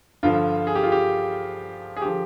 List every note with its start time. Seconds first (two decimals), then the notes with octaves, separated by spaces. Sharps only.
0.23 G2 D3 F3 F4
0.67 G#4
0.75 G4
0.83 F4
0.92 G4
1.97 G#4
2.02 D3 F3 G4